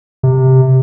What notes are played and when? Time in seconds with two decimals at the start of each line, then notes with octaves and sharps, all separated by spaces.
0.23 C3